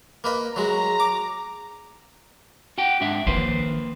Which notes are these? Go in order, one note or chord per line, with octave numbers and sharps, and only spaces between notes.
A#3 B4 D#5
F#3 G#3 A#5
D6
F#4 F#5 G5
G#2 D4 E5
D#3 F3 A#3 B4 C5